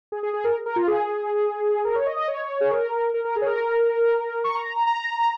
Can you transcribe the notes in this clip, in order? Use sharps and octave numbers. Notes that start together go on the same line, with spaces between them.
G#4
G#4
G#4
A#4
A#4
F4
G#4
A#4
C#5
D#5
D#5
C#5
G#4
A#4
A#4
A#4
G#4
C#5
A#4
C#6
A#5
A#5
A#5
A#5